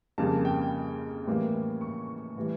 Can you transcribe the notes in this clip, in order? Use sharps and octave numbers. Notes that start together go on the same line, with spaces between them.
F2 C#3 G3 A#3 A5
G5
A2 E3 G3 A#3
C#6
A2 E3 G3